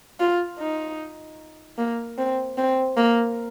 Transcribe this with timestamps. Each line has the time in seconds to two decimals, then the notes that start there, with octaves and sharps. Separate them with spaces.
0.20 F4
0.59 D#4
1.78 A#3
2.18 C4
2.57 C4
2.97 A#3